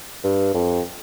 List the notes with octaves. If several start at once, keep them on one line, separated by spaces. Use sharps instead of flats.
G2
F2